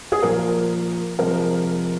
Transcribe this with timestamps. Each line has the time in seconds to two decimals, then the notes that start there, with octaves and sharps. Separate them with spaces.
0.12 G#4
0.23 A#2 F3 A#3 A#4
1.18 C3 F3 G#3 A#4